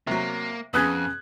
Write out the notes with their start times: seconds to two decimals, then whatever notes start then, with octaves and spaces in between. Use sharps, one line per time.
0.07 C3 F#3 A#3
0.74 F2 B3 C#4 G#4 D#6 F#6 G#6